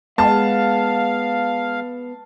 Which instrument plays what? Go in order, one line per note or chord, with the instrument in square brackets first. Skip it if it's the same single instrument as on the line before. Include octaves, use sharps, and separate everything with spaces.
[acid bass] G#3 [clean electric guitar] B3 [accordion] F5 [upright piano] A5